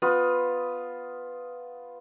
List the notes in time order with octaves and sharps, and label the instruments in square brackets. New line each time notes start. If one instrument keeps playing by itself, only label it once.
[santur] B3 F4 B5 D#6